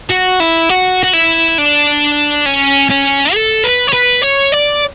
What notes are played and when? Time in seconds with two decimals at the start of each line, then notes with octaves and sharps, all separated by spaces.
0.10 F#4
0.40 E4
0.69 F#4
1.03 F#4
1.13 E4
1.58 D4
2.46 C#4
2.90 C#4
3.34 A4
3.64 B4
3.87 C#5
3.93 B4
4.22 C#5
4.52 D5